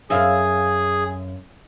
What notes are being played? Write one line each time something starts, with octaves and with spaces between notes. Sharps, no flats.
F#2 G#4 E5 F5